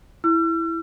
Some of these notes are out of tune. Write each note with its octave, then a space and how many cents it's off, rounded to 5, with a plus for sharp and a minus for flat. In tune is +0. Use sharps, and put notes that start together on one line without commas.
E4 +0 E6 +45